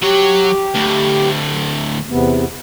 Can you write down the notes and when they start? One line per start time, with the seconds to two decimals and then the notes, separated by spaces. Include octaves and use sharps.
0.02 F#3 G4 C#5
0.75 D2 A2
2.10 E2 C3 B3